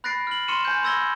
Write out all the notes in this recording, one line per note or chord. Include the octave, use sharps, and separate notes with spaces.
B5 F#6 A6 A#6 C7 D7
F6 F#7
C6 C#6 F6 C#7 D#7 E7
G#5 G6
B5 C6 E6 G#6 A#6 G7